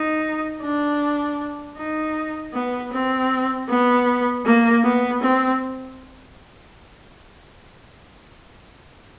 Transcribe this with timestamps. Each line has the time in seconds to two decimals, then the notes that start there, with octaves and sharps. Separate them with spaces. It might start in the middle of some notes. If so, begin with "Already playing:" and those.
Already playing: D#4
0.62 D4
1.77 D#4
2.54 B3
2.92 C4
3.69 B3
4.45 A#3
4.84 B3
5.22 C4